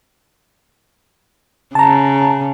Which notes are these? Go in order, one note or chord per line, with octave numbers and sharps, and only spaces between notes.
C#3 A5 A#5